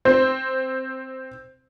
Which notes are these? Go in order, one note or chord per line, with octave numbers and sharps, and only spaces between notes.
C4 C5